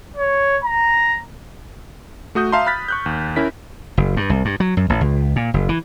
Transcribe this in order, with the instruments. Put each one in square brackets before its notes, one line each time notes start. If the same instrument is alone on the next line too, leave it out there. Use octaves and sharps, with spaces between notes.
[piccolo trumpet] C#5
A#5
[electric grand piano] A3 F#4 D#6 G6
E5 F5 A5 A#5 C6
B5 F6 F#6 A6 B6
C#6 F#6 G6
D#2
C#4 E4 A#4 B6
[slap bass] F#1
G2
C2
G2
F#3
F#2
A1
C#2
A#2
F#1
E3